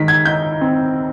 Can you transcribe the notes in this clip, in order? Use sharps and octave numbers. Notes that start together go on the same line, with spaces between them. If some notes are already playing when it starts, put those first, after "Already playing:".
Already playing: D#3 G#3 B6
G#6
D#4 G6
C4